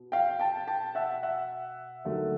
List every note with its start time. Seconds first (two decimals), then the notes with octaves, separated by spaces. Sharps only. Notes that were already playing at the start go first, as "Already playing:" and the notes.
Already playing: B2
0.12 F5 G5
0.39 G5 A5
0.67 G5 A5
0.95 E5 F#5
1.23 E5 F#5
2.05 D#2 D3 F#3 A3